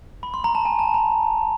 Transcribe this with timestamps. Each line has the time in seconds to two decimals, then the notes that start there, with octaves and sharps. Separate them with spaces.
0.23 B5
0.34 C6
0.44 A#5
0.55 A5
0.65 G#5
0.79 A5
0.94 A#5